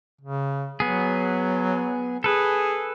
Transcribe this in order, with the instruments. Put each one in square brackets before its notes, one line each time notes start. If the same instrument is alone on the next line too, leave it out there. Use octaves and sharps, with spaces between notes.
[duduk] C#3
[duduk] F#3 [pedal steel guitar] B3 G#4
[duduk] G#4 [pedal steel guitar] A4 B4